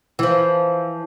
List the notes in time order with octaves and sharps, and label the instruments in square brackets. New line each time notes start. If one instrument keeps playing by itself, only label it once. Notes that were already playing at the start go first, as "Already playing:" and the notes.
[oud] E3 F3